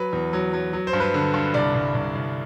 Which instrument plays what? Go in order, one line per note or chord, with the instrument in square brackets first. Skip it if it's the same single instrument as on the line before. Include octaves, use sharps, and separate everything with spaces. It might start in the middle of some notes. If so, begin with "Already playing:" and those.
Already playing: [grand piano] F#3 B4
E2
F#3
F#3
F#3
C5
G2
B4
D3
G2
C2 D5
C2
C2
C2